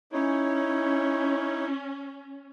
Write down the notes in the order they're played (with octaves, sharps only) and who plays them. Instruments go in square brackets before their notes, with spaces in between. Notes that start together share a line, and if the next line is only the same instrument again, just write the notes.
[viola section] C#4 [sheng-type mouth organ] D#4 E4 C#5